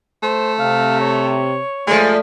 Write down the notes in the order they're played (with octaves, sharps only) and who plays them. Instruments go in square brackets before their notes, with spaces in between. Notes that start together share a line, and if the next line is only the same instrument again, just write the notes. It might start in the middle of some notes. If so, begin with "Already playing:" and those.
[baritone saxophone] A3 [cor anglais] C5
[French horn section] C3 [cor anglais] F5
[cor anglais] C#5
[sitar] A#2 F3 [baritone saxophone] G#3 [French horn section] A3